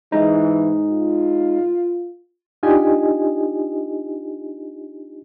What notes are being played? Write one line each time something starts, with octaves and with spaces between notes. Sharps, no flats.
E3 G#3 D#4
F4
D4 D#4 F4 G4 D#5 G#5